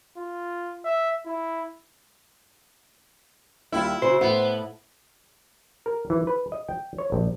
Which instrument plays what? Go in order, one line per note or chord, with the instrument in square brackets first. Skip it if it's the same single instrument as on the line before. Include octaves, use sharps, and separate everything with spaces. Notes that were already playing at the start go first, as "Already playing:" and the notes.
[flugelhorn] F4
E5
E4
[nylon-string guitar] D#2 G3 F4 [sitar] E4
[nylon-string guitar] C#3 F#4 [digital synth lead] C5
[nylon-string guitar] A2 E4 [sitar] B3
[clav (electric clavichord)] A#4
E3
B4
D#5
G5
C#5
A#1